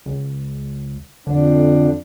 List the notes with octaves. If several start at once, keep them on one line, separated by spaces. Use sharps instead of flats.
C#2
F2 D3 D4